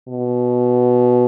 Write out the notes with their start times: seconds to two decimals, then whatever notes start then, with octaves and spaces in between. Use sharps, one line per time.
0.08 B2